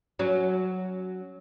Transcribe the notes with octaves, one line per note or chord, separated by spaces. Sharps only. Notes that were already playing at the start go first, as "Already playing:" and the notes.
F#3 C#4